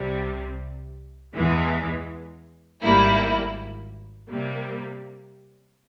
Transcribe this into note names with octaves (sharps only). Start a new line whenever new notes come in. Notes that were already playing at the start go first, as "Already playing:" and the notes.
Already playing: C2 C3 G3
E2 E3 G#3
G#1 G#2 G3 A#3 E4
C3 G3 A#3